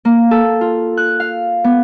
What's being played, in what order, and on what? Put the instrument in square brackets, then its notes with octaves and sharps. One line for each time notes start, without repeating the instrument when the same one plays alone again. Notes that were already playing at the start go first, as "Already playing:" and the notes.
[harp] A#3
A4
F4
F#6
F5
B3